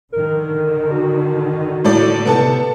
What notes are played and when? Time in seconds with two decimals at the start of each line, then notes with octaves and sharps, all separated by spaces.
0.12 D3 D#3 A#4
0.91 F#4
1.85 A2 A4 D5
2.26 C3 B3 A4 A5